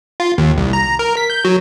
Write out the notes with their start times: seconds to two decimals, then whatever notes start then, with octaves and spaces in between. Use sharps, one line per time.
0.20 F4
0.38 D#2
0.58 C2
0.73 A#5
0.99 A#4
1.17 B6
1.30 G6
1.45 F#3